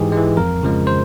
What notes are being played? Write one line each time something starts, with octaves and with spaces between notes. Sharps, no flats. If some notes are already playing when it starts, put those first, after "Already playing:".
Already playing: G#2 E3 G#3 G4 G#4
G#3
E3
F2 A#4
C#3 F3 G#3
C5